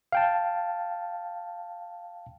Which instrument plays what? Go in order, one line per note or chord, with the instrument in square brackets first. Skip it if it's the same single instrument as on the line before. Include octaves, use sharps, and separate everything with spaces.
[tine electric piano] F5 G5 A5